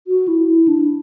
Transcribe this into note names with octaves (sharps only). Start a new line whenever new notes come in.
F#4
E4
E4
D4